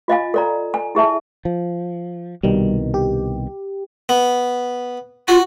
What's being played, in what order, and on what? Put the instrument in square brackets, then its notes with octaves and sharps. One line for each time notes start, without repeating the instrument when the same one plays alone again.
[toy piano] F4 D#5 F5 G#5
A4 D5 A#5
G#5
E4 G#4 E5 A5
[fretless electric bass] F3
[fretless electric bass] C2 B2 D#3 [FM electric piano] G3
[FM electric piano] G4
[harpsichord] B3
[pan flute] F4 [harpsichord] F#4